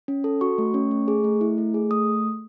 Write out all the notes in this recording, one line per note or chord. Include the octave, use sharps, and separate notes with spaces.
C#4
A4
F#4 C#6
A3
C#4
A3
G#4
A3
E4
A3
G#4
A3 D#6